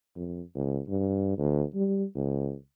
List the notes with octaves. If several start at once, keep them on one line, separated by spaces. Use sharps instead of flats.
F2
C#2
G2
D2
G3
C#2